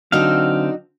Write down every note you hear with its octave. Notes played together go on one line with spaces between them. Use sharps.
D3 F#3 C4 D#4 F#4 D5 F5